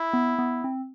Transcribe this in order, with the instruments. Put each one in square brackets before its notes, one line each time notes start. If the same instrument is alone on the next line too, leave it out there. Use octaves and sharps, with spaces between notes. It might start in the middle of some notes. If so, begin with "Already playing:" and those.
Already playing: [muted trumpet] E4
[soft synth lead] B3
B3
C4